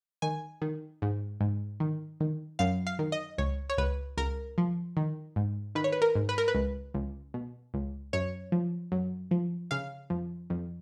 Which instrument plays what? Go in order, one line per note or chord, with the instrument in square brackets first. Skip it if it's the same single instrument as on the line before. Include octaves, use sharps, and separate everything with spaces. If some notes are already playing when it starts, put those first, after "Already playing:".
[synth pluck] D#3 G#5
D#3
G#2
G#2
D#3
D#3
F#2 F5
F5
D#3
D#5
C#2 C#5
C#5
C#2 B4
C#2 A#4
F3
D#3
G#2
D#3 B4
C#5
B4
A#4
G#2
B4
A#4
B4
C#2
C#2
B2
C#2
F#2 C#5
F3
F#2
F3
C#3 F5
F2
F2